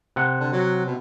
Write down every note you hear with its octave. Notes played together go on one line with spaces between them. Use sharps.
C3 F#5
D3
F#3
B2